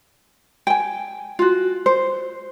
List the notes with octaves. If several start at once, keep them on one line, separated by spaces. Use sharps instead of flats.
G5 G#5
F4 F#4
C5